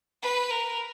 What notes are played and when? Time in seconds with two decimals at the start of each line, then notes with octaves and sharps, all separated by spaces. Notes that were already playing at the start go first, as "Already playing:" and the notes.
0.23 B4
0.51 A#4